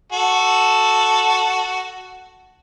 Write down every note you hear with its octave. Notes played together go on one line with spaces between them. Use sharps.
F#4 A4